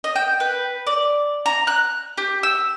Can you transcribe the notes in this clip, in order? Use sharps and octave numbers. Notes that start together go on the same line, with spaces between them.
D#5
G5
B4
D5
A#5
F#6
G4
E6